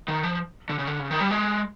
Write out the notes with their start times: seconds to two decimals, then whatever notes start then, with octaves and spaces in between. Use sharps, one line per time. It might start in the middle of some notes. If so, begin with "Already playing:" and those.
0.08 D#3
0.24 F3
0.69 D3
0.79 C#3
0.87 D3
0.99 C#3
1.11 D#3
1.20 G3
1.31 G#3